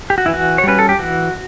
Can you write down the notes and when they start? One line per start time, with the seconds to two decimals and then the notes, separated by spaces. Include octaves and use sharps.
0.10 G4
0.18 F#4
0.26 E3 E4
0.34 F#4
0.58 C#5
0.64 G3 C#4 B4
0.79 A4
0.89 G4
0.99 E3 F#4